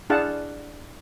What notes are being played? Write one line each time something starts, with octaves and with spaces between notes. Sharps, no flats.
D4 E4 G#4 F5 F#5 A5